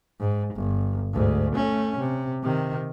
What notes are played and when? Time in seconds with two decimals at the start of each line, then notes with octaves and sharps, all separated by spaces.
0.20 G#2
0.55 G1
1.14 D2 G#2
1.55 A3 C#4
1.99 C3
2.43 C3 D#3